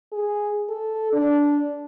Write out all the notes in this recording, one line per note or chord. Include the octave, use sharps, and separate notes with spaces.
G#4
A4
D4